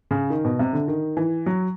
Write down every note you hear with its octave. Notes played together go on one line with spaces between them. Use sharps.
C#3
D#3
B2
C3
D3
D#3
E3
F#3